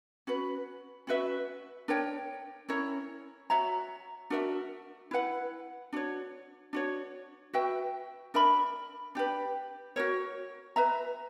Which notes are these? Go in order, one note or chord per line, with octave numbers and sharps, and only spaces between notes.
C#4 F#4 B4
C#4 F#4 B4 E5
D4 A#4 C#5 G5
C#4 E4 A#4 C#5
F#4 C#5 E5 A#5
D4 F#4 A#4 E5
E4 B4 F#5
D4 F#4 C#5
D4 F#4 C#5
F#4 B4 E5 G5
D4 A#4 E5 B5
D4 G4 B4
F#4 A#4 C#5
B4 E5 A#5